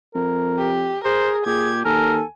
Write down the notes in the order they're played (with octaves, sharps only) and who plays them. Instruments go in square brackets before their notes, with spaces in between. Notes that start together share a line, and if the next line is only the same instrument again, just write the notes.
[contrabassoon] F2 [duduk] A#4
[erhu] G4
[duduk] G#4 [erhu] A#4 [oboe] C5
[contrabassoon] A#2 [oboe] G4 [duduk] G#4 [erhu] G#6
[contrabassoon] D#2 [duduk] A4 [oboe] A#4 [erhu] G#5